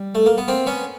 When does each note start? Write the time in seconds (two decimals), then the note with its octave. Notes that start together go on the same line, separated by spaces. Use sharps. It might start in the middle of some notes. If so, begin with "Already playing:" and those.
Already playing: G3
0.15 A3
0.26 A#3
0.38 B3
0.48 A#3 C4
0.66 B3 C#4